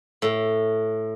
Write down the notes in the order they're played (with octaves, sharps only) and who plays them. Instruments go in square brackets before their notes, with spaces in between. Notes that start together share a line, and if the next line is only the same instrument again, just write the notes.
[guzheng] A2